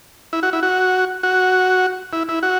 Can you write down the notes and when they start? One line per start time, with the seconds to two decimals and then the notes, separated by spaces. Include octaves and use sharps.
0.33 E4
0.43 F#4
0.53 E4
0.63 F#4
1.23 F#4
2.13 E4
2.29 E4
2.43 F#4